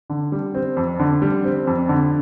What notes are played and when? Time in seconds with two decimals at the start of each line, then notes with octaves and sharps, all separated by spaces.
0.10 D3
0.32 G3
0.55 C4
0.77 F2
1.00 D3
1.22 G3
1.44 C4
1.67 F2
1.89 D3